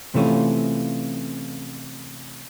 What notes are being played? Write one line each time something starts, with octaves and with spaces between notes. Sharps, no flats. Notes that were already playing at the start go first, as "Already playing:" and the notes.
C3 E3 A3 C#4 F4